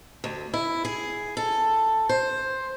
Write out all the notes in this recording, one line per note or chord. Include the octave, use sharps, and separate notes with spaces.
D2
E4
G#4
A4
C5